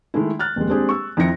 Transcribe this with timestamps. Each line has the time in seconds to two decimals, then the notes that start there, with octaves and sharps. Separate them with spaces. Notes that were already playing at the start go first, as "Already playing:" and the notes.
0.14 D#3 G#3 A3 E4
0.39 F6 F#6 A6
0.56 D#1 F2 G#3
0.69 G#3 C4 D4 G4 G#4
0.89 C#6 E6
1.17 F2 D#3 E4 A#6 C#7